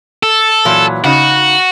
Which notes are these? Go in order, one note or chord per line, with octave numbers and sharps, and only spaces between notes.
A4
A#2 E3 F#3
C#3 D#4 F#4